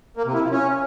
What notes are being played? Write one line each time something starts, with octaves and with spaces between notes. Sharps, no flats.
A#3
C3
E4
F3
C#4